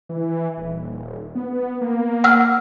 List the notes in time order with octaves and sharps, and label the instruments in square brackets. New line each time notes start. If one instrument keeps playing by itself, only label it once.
[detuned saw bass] E3
D#1
B3
A#3
[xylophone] F#5 E6 F6